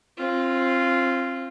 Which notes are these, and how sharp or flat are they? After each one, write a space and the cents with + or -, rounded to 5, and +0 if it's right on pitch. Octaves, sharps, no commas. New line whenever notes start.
C4 +25 F4 -10